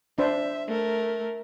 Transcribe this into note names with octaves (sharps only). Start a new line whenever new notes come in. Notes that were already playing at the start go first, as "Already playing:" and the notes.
D4 C5 E5
A3 A#4